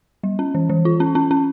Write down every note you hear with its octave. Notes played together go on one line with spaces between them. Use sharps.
G3
C#4
E3
E3
F4
C#4
C#4
C#4